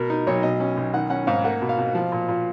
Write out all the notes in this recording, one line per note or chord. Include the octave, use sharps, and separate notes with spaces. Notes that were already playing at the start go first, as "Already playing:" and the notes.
Already playing: B2 A#4
D#4
B1 C#5
B2 D#5
C#4
B1
D#3 F#5
C#4 F#5
G#2 F5
A#3 F#5
B2
F5
B2
F3
A#2
A#2